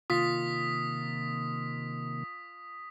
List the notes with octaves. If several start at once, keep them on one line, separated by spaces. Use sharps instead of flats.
C3 D#3 A#3 F4 D#6 B6